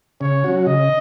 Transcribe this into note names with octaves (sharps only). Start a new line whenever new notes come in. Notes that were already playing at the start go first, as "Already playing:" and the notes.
C#3 C#5
F#3 C#4 F#4
C#3 D#5